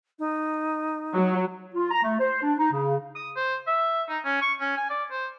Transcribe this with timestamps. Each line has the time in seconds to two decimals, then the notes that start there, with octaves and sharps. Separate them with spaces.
0.19 D#4
1.15 F#3
1.75 F4
1.91 A#5
2.03 A3
2.20 C5
2.42 D4
2.59 D#4
2.72 C#3
3.16 D#6
3.37 C5
3.67 E5
4.09 D#4
4.25 C#4
4.42 C#6
4.60 C#4
4.77 G#5
4.90 D5
5.11 C5